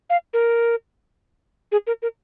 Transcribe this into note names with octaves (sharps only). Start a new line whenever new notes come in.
F5
A#4
G#4
A#4
A#4